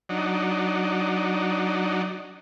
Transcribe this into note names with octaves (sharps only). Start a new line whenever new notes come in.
F#3 D4 D#4